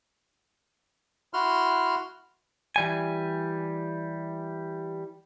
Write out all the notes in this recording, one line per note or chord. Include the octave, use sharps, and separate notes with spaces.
E4 F#4 C6 F6
E3 G3 G#5